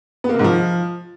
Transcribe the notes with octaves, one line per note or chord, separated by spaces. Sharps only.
B3
A#3
C3
G#2
F3